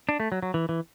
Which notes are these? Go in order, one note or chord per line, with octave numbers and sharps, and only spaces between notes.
D4
A3
F#3
F#3
E3
E3